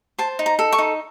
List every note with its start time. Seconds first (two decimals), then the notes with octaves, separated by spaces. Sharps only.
0.18 C5 A5
0.39 D#4
0.46 A#5
0.59 A4
0.72 C#6
0.78 D#4